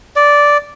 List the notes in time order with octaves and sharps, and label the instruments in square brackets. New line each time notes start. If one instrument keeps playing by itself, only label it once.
[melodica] D5